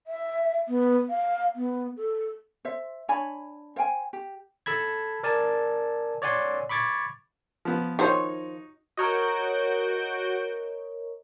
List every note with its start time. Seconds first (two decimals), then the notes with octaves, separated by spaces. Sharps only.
0.07 E5
0.68 B3
1.10 F5
1.56 B3
1.97 A4
2.65 C5 E5
3.08 D4 C#5 G#5 B5
3.76 C5 F5 G5 G#5
4.13 G4
4.66 A4 A5 B5 G#6
5.23 A#4 D5 G#5 A5
6.22 C#5 D5 F#5 G#5 C6
6.69 B5 C#6 D6 G#6 A6
7.65 F3 B3
7.99 D#3 F3 D#4 F#4 C5 C#5
8.97 F#4 A#4 C#5 D#5 G6 D7